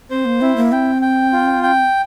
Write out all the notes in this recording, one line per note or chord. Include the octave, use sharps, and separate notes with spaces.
C4 C5
A#3
C4 E4
A#3
C4 G5
G5
F4
G5